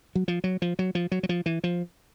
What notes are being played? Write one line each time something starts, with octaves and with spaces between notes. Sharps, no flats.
F#3
F3
F#3
F3
F#3
F3
F#3
F#3
F3
E3
F3